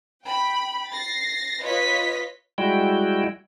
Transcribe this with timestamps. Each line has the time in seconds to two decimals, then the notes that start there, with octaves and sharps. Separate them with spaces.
0.24 G5 B5
0.90 A6 A#6 C7
1.62 F4 B4 C#5 D#5 B6
2.58 G3 G#3 E4 F#4 G5